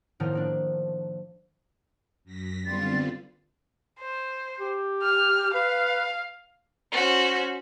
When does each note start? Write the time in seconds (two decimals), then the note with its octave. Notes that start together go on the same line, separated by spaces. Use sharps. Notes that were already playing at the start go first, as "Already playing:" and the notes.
0.20 A2 D#3 F3 B3 A#5 F6
0.33 A3 A#3 D4
2.24 F#2 A#6 B6
2.66 D3 G3 B3 C4 F4 A6
4.00 C5
4.60 G4
5.02 F6
5.54 B4 F5
6.92 C#4 F#4 C5